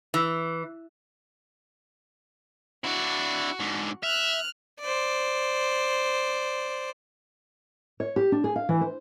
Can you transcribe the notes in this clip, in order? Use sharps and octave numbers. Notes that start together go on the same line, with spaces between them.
E3
D4 E4 F#4
G#2 D3
E5 F6 F#6
C5 D5
C#5
G4
D4
G#4
F5
E3
C5